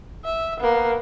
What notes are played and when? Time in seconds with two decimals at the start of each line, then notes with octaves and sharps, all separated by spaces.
0.25 E5
0.60 A#3 B3